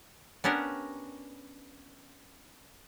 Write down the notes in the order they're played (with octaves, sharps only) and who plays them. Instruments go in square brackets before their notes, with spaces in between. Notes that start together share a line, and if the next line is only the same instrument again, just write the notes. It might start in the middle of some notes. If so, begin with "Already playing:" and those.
[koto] B3 C#4 D4 G4 A#4